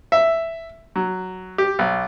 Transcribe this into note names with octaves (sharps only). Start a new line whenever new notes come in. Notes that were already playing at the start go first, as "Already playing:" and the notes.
E5
F#3
G4
B1